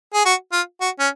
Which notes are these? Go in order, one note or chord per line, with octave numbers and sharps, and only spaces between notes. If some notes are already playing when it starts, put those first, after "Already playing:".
G#4
F#4
F4
F#4
C#4